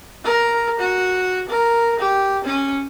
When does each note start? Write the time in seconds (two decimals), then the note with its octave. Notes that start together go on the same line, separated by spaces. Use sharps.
0.24 A#4
0.79 F#4
1.49 A#4
1.99 G4
2.44 C#4